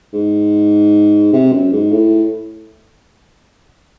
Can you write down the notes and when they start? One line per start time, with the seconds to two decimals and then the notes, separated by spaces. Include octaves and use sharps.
0.13 G#2
1.33 C3
1.52 F#2
1.73 G#2
1.92 A2